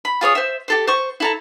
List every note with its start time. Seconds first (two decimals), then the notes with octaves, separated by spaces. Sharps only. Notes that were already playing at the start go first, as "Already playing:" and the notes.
0.05 B5
0.21 F4 G#4 C#5 D#6
0.35 C5 E5
0.68 G4 A4 C5
0.87 C5 C#6
1.20 E4 A4 A#5